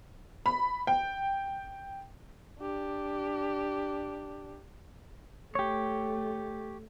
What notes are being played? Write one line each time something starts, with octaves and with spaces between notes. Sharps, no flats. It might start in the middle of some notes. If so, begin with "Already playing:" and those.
B5
G5
D4 G4
A3 G4 C#5